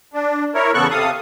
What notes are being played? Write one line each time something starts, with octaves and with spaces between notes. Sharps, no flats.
D4
E4 A#4 C#5
E2 C#3 B3 A4 C#6 F#6
C3 A4 F5 D#6